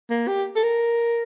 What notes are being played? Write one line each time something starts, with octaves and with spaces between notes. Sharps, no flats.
A#3
G4
A4
A#4